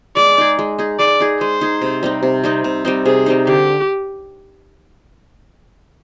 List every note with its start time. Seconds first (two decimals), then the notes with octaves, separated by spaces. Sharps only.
0.16 G#3 D5
0.38 D#4 G#4
0.59 G#3
0.79 D#4 G#4
0.99 G#3 D5
1.20 D#4 G#4
1.40 G#3 C5
1.61 D#4 G#4
1.81 C3
2.03 G3 C4 D#4
2.23 C3
2.44 G3 C4 D#4
2.64 C3
2.85 G3 C4 D#4
3.06 C3 G#4
3.26 G3 C4 D#4
3.47 D3 G4